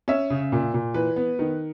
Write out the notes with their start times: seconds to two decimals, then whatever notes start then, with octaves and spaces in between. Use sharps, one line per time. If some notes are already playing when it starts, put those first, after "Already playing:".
0.08 C#4 E5
0.30 C#3
0.52 A#2
0.74 A#2
0.94 E3 B4
1.16 B3
1.39 D#3